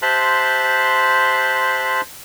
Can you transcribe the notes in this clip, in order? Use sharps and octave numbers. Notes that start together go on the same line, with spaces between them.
G4 C5 E5 A5 C6 F#6